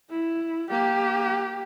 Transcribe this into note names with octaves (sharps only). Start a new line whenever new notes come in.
E4
A#3 G4